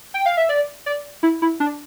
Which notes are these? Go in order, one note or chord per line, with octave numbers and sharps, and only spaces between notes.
G5
F5
E5
D5
D5
E4
E4
D4